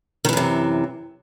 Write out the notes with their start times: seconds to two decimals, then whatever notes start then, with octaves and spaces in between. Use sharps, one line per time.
0.25 D#3
0.29 E3
0.33 F#2
0.37 C3